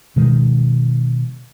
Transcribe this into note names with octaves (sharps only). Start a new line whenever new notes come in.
B2 D#3 G#3